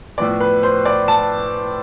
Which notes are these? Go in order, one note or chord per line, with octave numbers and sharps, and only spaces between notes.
A2 F3 B3 D5
B4
C5
D5
A5